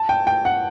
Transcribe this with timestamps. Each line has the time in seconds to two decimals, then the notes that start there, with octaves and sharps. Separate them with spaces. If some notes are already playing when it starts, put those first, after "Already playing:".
Already playing: A5
0.09 G5
0.27 G5
0.45 F#5